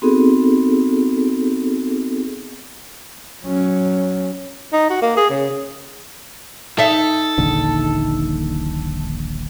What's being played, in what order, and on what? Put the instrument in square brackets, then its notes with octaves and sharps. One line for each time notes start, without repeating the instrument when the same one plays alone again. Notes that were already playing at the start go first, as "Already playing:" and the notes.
[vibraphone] B3 C4 D#4 F#4 G#4 A4
[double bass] F#3 C#4
[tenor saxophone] D#4
F#4
A#3
G#4
C#3
[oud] D#4 E5 [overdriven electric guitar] A4
[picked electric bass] D#1 A#1 D3